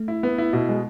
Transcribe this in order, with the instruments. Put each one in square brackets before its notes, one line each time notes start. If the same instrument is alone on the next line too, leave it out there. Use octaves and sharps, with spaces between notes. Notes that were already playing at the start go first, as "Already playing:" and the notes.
Already playing: [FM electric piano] A3
[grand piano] E4
B3
E4
B2
G#3